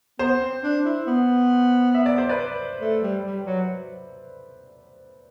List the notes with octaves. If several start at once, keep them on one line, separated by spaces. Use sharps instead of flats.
B3 C5
C4
D4
E4
B3
E5
D5
C5
B4 D5
A3
G3
G3
F#3